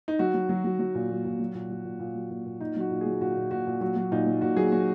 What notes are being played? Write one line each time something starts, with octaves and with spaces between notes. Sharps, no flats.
D#4
F#3 F#4
F#3
F#3
F#3
F#3
A#2
F#3
A#2
F#3
A#2
F#3
A#2
A#2
F#3
A#2
A#2
A#2 D#4
F#3 F#4
A#2
G#4
F#3
A#2 F#4
A#2
A#2 F#4
A#2
F#3 F#4
F#3
A#2 D#4
F#3
A#2 F#4
F#3 G#4
F#3 F#4